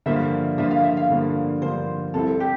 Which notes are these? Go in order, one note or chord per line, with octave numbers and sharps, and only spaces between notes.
G2 D3 F3 A#3 F4 E5
G2 D3 F3 A#3 F4 E5
F5
E5
F5
G2 D3 F3 A#3 F4
G2 D3 F3 A#3 F4 C5
C2 C3 G3 C4 E4 A4
G4